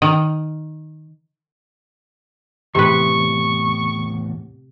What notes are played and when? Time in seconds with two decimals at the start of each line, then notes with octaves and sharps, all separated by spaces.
0.02 D#3
2.75 E2 A2 C3 B4 C#6